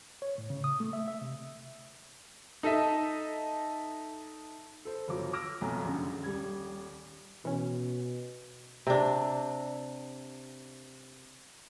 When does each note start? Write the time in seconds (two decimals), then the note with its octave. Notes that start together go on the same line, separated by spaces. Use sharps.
0.22 C#5
0.38 A2
0.50 C#3
0.64 D#6
0.80 A3
0.93 E5
1.08 E5
1.21 C3
2.63 D#4 A4 D#5 E5
4.85 A4 C5
5.08 G1 F3 F#3 D6
5.33 D6 E6 F6 A#6 D7
5.61 B1 F2 A3 G#5 A#5
5.85 A#1 F#2 D3
6.23 D#1 G3 G#6
7.45 B2 E3 C#4
8.87 C3 D4